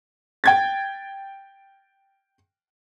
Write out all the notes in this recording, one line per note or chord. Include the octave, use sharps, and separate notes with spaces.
G5 G#6 A6